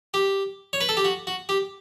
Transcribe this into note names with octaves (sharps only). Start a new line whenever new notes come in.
G4
C#5
B4
A4
G4
F#4
F#4
G4